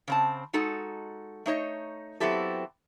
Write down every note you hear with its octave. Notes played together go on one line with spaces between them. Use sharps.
C#3 C4 A5
G#3 D#4 F#4 A4
A3 D#4 C#5 D#5
F#3 B3 C4 E4 G4 A4